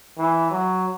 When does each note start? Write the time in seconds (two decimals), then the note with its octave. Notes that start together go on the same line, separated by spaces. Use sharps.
0.18 E3
0.51 F#3